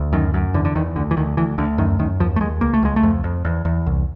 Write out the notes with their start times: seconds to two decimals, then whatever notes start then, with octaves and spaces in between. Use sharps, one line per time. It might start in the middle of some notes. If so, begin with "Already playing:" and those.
Already playing: D2
0.13 F#2 D#3
0.34 F#2
0.54 E2 D3
0.65 D3
0.75 E2 D#3
0.96 D2 D3
1.11 E3
1.17 D2 D#3
1.37 D2 E3
1.58 D2 D3
1.78 F#2 D#3
1.99 F#2 D#3
2.20 D#2 F3
2.36 A3
2.41 D#2 G#3
2.61 C#2 A#3
2.74 A3
2.83 C#2 G#3
2.96 A3
3.03 F2
3.24 F2
3.45 E2
3.65 E2
3.86 C2